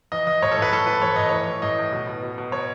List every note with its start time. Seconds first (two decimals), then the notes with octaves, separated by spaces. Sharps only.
0.12 E3 D#5
0.27 E3 D#5
0.42 A2 C#5
0.52 A4
0.57 A2 B4
0.72 E3 A4
0.87 E3 B4
1.02 A2 C#5
1.16 A2 D#5
1.29 E3 C#5
1.47 E3
1.62 A2 D#5
1.78 A2
1.92 B2
2.07 B2
2.22 B2
2.38 B2
2.52 B2 C#5